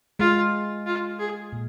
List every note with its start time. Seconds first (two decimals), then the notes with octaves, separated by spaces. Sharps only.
0.19 G#3 F4
0.86 F4
1.19 G#4
1.52 A#2